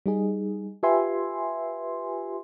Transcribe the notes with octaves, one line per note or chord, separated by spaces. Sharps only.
G3 D#4 G#4
F4 G4 B4 E5 G#5 C6